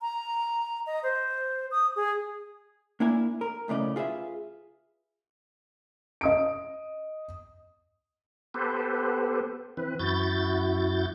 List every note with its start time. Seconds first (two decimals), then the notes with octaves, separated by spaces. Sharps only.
0.02 A#5
0.87 D#5
1.03 C5
1.71 D#6
1.96 G#4
3.00 A#3 D4 E4 A#4 G#5
3.41 A#4
3.68 B1 A2 C#3 D5 D#5
3.96 F4 G#4 B4 E5
6.21 D#5 D#6 D7
8.54 B3 G4 A4 B4 C5
9.77 E3 C4 B4
9.99 F#2 E4 F#4 G6 A6